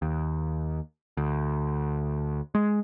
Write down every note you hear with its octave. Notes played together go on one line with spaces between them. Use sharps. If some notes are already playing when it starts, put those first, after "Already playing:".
D#2
D2
G#3